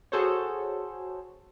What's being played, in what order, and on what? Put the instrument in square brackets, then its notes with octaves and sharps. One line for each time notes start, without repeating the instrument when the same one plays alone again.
[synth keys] F#4 G#4 A4 C5 C#5